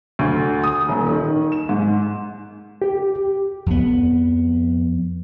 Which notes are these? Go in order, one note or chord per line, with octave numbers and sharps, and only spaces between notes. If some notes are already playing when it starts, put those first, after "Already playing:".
D2
D#6
D#1
D#3
E7
G#2
G4
F2 B3